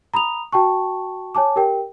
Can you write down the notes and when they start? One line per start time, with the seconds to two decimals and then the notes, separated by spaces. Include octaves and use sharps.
0.14 A#5 B5 D#6 F7
0.52 F#4 G5 A5 C#6
1.35 C#5 G#5 A5 D6
1.56 G4 A#4 G5